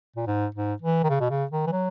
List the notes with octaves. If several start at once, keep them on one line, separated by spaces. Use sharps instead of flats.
A#2
G#2
G#2
E3
D#3
C#3
B2
C#3
D#3
E3
F#3